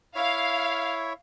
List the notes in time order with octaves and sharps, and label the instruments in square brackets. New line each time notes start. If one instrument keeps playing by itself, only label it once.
[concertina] E4 C#5 E5 [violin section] F5